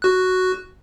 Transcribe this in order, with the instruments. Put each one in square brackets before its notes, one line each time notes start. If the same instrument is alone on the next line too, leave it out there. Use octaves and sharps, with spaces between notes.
[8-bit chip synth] F#4 F#6